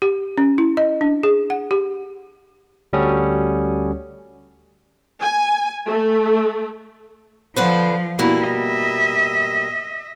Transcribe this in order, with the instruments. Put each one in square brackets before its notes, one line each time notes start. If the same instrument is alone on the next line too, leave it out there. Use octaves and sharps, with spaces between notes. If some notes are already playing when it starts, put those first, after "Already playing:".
[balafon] G4
C#4
E4
D#5
D4
G#4
F#5
G4
[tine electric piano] D2 G3 C#4 F#4 A4 D#6
[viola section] G#5
A3
[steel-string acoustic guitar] D3 B4 C5 [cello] F3
[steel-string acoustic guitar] B2 G3 A#3 [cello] E4
[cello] D#5 E5